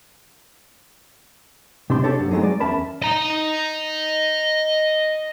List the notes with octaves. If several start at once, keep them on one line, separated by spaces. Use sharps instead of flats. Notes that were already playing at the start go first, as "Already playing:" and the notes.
C3 C4 D4 C6
D4 G4 A4 C#5 D5
F#2 A#3
F#3 G#3 A3 C4 D#4
D5
E2 C#4 A#4 E5 A5 B5
D#5 A#5